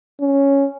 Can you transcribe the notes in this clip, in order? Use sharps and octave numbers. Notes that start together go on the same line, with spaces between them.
C#4